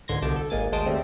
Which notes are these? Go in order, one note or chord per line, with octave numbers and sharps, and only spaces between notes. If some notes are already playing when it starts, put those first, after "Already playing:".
C#2 G#2 D3 C6 G#6 A#6
C2 B2 D3 A5 D6 G6
A4
G#1 G#3 A#3 G#5 A6
D2 G#3 C5 A5 D#6 D7
D3 G3 A3 C4